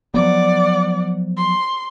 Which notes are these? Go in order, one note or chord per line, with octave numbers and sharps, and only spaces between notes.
F3 F#3 B3 D5 F#5
C6